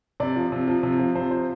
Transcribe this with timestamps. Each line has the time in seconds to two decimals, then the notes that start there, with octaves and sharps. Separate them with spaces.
0.20 C3 D5
0.36 F3
0.52 C3
0.68 F3
0.83 C3
0.99 F3
1.15 C3 C5
1.31 F3 C5